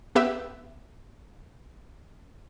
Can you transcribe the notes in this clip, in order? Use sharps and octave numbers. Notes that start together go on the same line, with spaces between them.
B3 G4 B4 E5